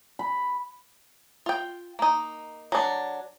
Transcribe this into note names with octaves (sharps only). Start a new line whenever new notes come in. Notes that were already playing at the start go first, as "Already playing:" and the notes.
B5
F4 G5
A#3 D#4
F#3 D4